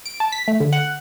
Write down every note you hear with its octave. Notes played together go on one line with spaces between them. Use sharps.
D7
A5
B6
A3
D3
F#5